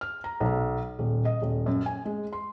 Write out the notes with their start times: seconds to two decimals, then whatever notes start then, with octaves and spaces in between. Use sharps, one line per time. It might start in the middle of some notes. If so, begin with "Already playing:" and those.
0.01 F6
0.24 A#5
0.40 B1
0.99 D#1
1.25 D#5
1.42 D#1
1.66 F#2
1.86 G#5
2.05 G#3
2.33 C6